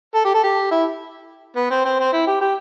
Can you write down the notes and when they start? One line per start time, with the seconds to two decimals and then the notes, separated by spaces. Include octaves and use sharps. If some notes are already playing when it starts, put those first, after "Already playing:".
0.15 A4
0.25 G4
0.34 A4
0.43 G4
0.71 E4
1.56 B3
1.71 C4
1.85 C4
2.00 C4
2.13 E4
2.27 G4
2.41 G4